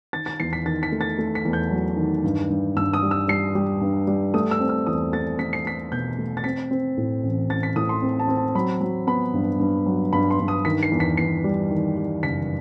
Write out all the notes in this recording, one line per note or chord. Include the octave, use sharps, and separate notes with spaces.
D#3 A6
A6
E2 C7
B6
D#3 A6
B6
A3
A6
A3
B6
E2
G6
F#3
D#3
G2
G2
G2 E6
D#6
G3
E6
G3 C7
G3
G2
G3
A3 D#6
E6
C4
E6
E2 D#6
A3 A6
A3 B6
C7
A3 B6
B2 G6
A3
A6
C4 B6
C4
A2
A1
A1 A6
B6
A2 D#6
C6
C4
A5
C4
A5
F#3 B5
F#3
B3 B5
G2
G2
F#3
G2 B5
C6
G2
D#6
D#3 B6
C7
E2
B6
E2 C7
G3
D#3
G3
F#1 B6